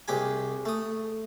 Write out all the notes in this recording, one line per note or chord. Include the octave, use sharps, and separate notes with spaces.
C2 G#3 G4 G#5
A3 D#6